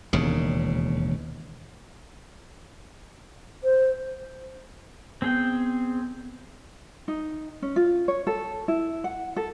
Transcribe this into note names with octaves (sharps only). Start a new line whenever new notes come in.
E1 D#2 C#3
C5
B3 C4 G#4 G5
D#4
C#4
F4
C#5
A4
E4
F#5
A4